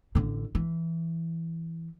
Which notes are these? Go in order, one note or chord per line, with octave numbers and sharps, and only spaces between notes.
A1 D3
E3